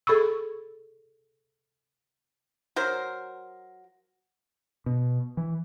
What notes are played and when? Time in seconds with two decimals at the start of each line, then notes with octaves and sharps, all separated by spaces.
0.07 G#4 A4 B5 C#6 E6
2.76 F#3 A#4 C5
4.86 B2
5.37 E3